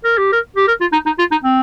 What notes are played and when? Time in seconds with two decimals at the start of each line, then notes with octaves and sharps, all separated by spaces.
0.04 A#4
0.18 G4
0.32 A#4
0.56 G4
0.68 A#4
0.81 F4
0.93 D#4
1.06 D#4
1.19 F4
1.31 D#4
1.44 C4